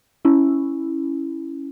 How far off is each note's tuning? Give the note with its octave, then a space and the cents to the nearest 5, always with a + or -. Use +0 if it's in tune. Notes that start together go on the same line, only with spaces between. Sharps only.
C#4 +0 E4 +0